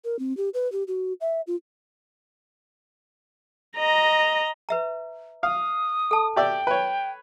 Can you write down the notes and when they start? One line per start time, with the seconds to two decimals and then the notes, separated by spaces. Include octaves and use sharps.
0.04 A#4
0.19 C4
0.37 G4
0.54 B4
0.72 G4
0.88 F#4
1.21 E5
1.47 F4
3.77 D#5 A#5
4.69 B4 E5 A#5
5.43 F5 D#6
6.11 A4 A5
6.36 G4 D5 E5 G5
6.67 B4 C#5